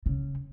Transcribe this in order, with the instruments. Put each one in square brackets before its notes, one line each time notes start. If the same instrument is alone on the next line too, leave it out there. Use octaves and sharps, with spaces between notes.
[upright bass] C#3